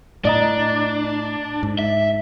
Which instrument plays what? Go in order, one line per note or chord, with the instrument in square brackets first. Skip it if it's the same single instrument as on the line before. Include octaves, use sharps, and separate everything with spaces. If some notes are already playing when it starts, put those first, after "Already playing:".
[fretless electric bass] A2 [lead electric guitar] D4 [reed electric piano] D5 D#5 A#5
[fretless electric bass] G#2
[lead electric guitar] E5